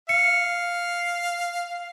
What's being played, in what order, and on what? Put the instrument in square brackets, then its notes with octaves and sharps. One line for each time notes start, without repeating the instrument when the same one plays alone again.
[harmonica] F5 [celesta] C#7